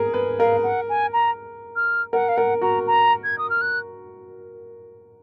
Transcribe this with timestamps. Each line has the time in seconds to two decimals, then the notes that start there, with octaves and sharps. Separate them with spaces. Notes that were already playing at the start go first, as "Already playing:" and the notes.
Already playing: G#4 A#4
0.14 B4
0.39 A#4 F5
0.63 F#5
0.89 G#5
1.13 A#5
1.76 F6
2.13 A#4 F#5
2.29 F5
2.37 A#4 F#5
2.62 F#4 A#5
2.87 A#5
3.24 G#6
3.38 D#6
3.50 F6
3.61 F#6